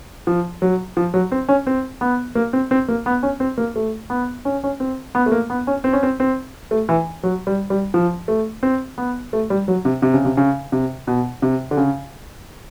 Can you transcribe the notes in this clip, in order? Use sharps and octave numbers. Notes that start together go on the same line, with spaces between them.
F3
F#3
F3
F#3
C4
C#4
C4
B3
A#3
C4
C4
A#3
B3
C#4
C4
A#3
A3
B3
C#4
C#4
C4
B3
A3
A#3
B3
C#4
C4
C#4
C4
C4
A3
E3
F#3
G3
G3
F3
A3
C4
B3
A3
G3
F#3
C3
C3
C#3
C3
C#3
C3
B2
C3
D3
C#3